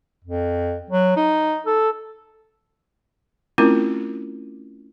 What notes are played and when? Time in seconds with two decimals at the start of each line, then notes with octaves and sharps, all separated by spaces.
0.24 F2
0.90 F#3
1.16 D#4
1.66 A4
3.58 A3 C4 C#4 E4 F4 A#4